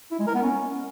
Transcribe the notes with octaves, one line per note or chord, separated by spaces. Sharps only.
E4
G#3
A#4
B3
C#4